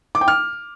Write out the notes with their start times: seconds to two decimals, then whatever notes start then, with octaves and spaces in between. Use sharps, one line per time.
0.15 D6
0.21 G5
0.28 F6